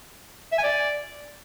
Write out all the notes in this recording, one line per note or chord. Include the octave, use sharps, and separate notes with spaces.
E5
G#5
D5